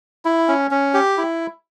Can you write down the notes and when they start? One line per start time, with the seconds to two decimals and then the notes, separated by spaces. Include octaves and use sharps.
0.25 E4
0.48 C#4
0.71 C#4
0.94 G4
1.18 E4